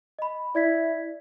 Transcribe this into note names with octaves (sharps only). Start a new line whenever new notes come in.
D#5 B5
E4 D5 G#6 B6